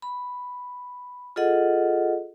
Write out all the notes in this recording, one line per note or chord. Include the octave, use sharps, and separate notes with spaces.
B5
F4 G#4 A4 D#5 F#5